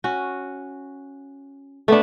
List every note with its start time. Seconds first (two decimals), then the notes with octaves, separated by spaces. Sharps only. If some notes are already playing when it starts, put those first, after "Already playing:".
0.04 C#4 F#4
1.88 A3 B3 D4